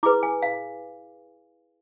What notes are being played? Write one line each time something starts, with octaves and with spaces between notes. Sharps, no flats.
E4 G#4 B4 D6
G#5
F5